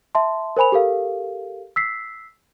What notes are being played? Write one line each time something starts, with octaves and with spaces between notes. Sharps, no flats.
E5 A5 C6
A#4 C5 G#5 B5 F7
G4 A4 A#4 F5
E6 B6 C7